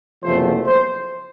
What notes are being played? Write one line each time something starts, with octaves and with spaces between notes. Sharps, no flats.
F#1 E2 C3 F3 A3 C5
C5